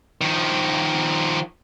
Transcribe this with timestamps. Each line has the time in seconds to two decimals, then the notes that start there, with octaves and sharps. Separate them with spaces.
0.21 D#3 F3